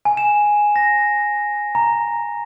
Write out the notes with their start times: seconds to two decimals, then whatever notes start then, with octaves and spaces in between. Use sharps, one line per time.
0.05 G#5
0.17 E7
0.76 A#6
1.75 A#5